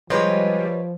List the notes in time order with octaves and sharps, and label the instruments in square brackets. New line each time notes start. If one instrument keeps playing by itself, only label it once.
[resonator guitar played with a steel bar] C3 G#3 [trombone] F3 [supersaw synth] G3 [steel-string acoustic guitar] B4 C#5 D#5